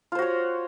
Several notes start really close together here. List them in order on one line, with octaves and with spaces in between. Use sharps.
F4 C5 F#4 C#5